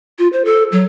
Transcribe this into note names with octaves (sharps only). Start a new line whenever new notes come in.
F4
C5
A4
F#3